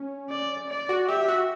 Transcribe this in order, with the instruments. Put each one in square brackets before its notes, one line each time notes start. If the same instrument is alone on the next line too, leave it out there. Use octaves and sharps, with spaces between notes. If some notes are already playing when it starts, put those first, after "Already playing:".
Already playing: [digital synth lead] C#4
[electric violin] D5
D5
[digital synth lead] F#4
[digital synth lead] G4 [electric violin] E5
[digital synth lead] F#4